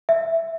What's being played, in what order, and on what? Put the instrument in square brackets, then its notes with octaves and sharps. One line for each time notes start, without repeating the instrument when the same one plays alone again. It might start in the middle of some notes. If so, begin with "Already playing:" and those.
[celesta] E5